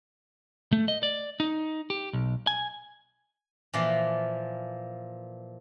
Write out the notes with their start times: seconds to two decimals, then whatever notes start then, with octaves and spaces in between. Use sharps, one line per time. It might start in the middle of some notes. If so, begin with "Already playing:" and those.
0.72 A3
0.88 D#5
1.03 D5
1.40 D#4
1.90 G4
2.13 B1
2.47 G#5
3.74 A#2 E3 F3 A#3